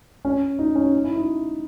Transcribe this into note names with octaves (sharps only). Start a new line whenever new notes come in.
C#4
D#4
C#4
D#4
E4
D#4